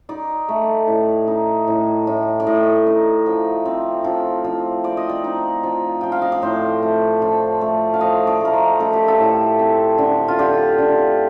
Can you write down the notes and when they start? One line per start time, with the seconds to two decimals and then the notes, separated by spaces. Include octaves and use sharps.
0.09 D#4 D5
0.49 A3
0.88 A2
1.28 D#4
1.67 A2
2.07 A2
2.40 D5
2.47 A2 D#5
2.87 D#4
3.26 F3
3.65 C4
4.04 F3
4.44 F3
4.84 C4 D5
4.97 D#5
5.09 D5
5.24 D#4
5.63 F3
6.01 F3 G5
6.12 F5
6.22 D#5
6.32 D5
6.42 A2 C5
6.83 A3
7.22 F3
7.61 A3
7.94 F5
8.01 F3 D#5
8.27 D5
8.41 A3 A#4
8.53 C5
8.80 A3 A4
8.93 G4
9.08 A4
9.19 A2
9.59 C4
9.98 D3
10.28 F4
10.39 D3 G4
10.78 D3